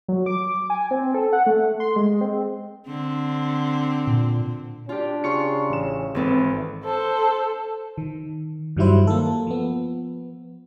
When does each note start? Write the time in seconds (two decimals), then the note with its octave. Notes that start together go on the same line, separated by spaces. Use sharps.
0.08 F#3
0.26 D6
0.70 G#5
0.91 C4
1.14 A4
1.33 F#5
1.47 A3
1.80 C6
1.96 G#3
2.21 C4
2.87 D3 C4
4.07 A#2
4.89 D4 F4 G4
5.24 C#3 F4 C6 C#6 C#7
5.70 A1 E7
6.15 G#1 E3 C4 A4 B4
6.85 A4 C5
7.98 D#3
8.77 G2 D#3 F#3 G3 E4 C5
9.07 A#3 A4
9.47 F3 B3